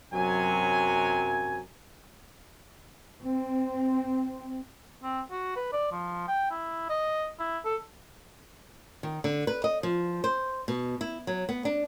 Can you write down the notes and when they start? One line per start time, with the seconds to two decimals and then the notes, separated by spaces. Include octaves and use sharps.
0.14 F#2 C3 F#3 G#5
3.21 C4
5.03 C4
5.31 F#4
5.56 B4
5.73 D5
5.92 F3
6.28 G5
6.51 E4
6.89 D#5
7.40 E4
7.65 A4
9.03 D#3
9.24 D3
9.47 B4
9.64 D#5
9.83 F3
10.24 C5
10.68 B2
11.01 E4
11.27 F#3
11.49 B3
11.65 D4